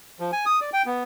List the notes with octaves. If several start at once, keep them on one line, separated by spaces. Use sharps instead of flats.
F3
G#5
D#6
D5
G5
B3